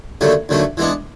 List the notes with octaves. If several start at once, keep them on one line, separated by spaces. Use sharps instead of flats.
D#2 D3 F#3 A3
D#2 D3 F#3 A3
E3 G#3 B3 D4